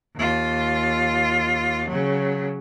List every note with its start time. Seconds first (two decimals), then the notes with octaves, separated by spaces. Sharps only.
0.16 D#2 F4
1.89 C#3 F#3